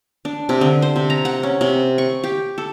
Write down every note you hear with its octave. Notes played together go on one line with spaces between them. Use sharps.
D4
C3
D3
C5
C3
A#5
F#5
C#4
C3
C#6
G4
A4